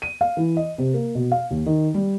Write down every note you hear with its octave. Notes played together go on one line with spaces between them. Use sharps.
D#7
F5
E3
D#5
C3
A#3
B2
F5
D#2
D#3
G3